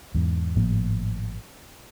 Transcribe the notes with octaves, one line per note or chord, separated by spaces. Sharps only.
E2 G#2
G#1 A2 F3 A#3